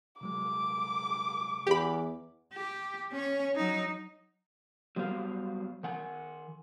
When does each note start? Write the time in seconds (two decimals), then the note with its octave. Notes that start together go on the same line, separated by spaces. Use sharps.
0.21 C3 F#3 G#3 D6
1.67 E2 G4 B5
2.54 G4
3.12 C#4 C#5
3.56 F#3 D#4
4.96 F#3 G3 B3 D4 C5 F5
5.83 D#3 F#5 G#5